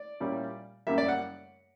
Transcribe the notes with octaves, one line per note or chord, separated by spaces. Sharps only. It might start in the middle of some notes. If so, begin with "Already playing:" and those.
Already playing: D5
A#2 G3 C#4 E4
F#2 C#3 G3 A#3 E5
D5
F#5